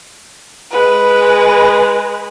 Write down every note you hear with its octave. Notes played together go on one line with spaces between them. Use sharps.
G#3 B4